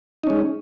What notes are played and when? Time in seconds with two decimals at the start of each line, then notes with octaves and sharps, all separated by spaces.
0.24 D#4
0.27 C#4
0.30 G#3